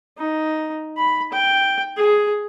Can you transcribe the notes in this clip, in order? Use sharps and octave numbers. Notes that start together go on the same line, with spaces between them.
D#4
B5
G5
G#4